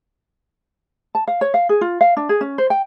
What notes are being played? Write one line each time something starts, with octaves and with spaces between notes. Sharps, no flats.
A5
F5
C#5
F5
G#4
F4
F5
D4
G#4
C#4
C5
G5